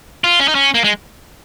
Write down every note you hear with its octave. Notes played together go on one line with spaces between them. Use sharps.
F4
C#4
D#4
C#4
A#3
G#3